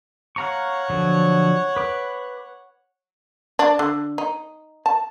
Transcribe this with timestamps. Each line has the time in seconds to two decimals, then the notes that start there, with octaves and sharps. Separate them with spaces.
0.36 C#5 F5 F#5 A#5 C#6
0.90 D3 F3 F#3
1.76 B4 D6
3.59 D4
3.79 D3
4.18 D#4
4.86 A5